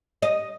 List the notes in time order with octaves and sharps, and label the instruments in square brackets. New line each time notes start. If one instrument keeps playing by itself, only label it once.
[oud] D#5